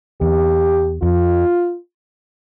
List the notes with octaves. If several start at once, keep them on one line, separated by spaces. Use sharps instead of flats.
E2 G4
F2 F4